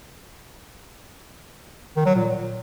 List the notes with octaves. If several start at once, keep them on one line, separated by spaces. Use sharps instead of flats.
D#3
F#3
A#2